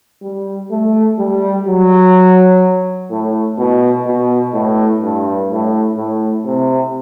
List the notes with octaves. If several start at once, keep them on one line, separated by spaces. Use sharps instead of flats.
G3
A3
G3
F#3
A2
B2
B2
A2
G2
A2
A2
C3